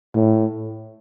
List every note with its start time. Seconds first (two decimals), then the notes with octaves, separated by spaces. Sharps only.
0.15 A2